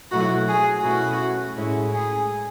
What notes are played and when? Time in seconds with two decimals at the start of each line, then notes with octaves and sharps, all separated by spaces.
0.11 B2 F#3 A3 E4 F#4
0.48 G#4
0.83 B2 A3 C#4 E4 F#4
1.55 A2 G#3 C#4 E4
1.91 G#4